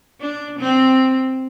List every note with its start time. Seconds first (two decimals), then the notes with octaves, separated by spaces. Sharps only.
0.21 D4
0.60 C4